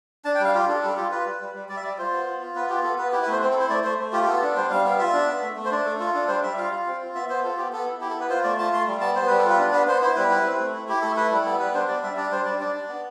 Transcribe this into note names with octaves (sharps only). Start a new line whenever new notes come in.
D4 A5
G5
G3 F5
F4 G4
D4 A4
G3 A4
F4 G4
F4 B4
G3
G3
G3
G3 D5
E5
G3 D5
F4 C5
B3
F4
F4
B3 B4
F4 G4
B3 A4
B3 B4
E4 G4
B4
A3 C5
C4 C5
A4
E4 C5
A3 D5
A3 C5
A3
F4 G4
G4
B3 A4
D4
G3 C5
G3 F5
B3 F5
F4 E5
D4
B3
A3
A3
C5
D4 D5
A3 A4
F4 A4
D4 A4
G3 C5
G3 E5
F4 F5
F4
C4
F4
B3 E5
B3 C5
F4 A4
B3 G4
B3 A4
E4
E4 G4
A4
B3
B4
F4 C5
A3 D5
F4 A5
A3 C6
G3
B3 A5
B3 C5
G3 B4
A4
F4
B4
D4
B3 B4
B3 C5
E4 C5
G3 B4
E4
C4
A3
E4
E4 G4
A3 A4
E4 B4
G3 A4
B3 A4
G3 B4
D4 C5
G3 D5
G3 E5
D4 D5
G3 C5
G3 D5
D4 D5
D4
B3